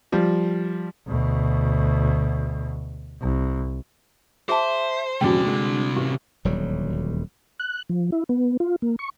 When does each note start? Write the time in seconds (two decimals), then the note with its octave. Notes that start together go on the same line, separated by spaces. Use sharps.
0.12 F3 G3
1.07 D2 B2
3.21 C2
4.49 G#4 C5 E5 A5
5.21 A#1 E2 C3 G3 C#4 F#4 D5 G5
5.45 D3 G#3 D4
5.96 A1 G4
6.45 D#1 D2 F#3 G3
7.59 F#6
7.89 F3
8.12 E4
8.29 B3
8.60 F4
8.82 A#3
8.99 C#6